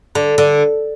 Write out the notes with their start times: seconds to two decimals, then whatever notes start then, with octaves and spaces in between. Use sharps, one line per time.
0.15 D3
0.38 D3